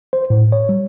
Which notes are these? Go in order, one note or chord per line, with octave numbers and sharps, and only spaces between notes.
C5
A2
C#5
G3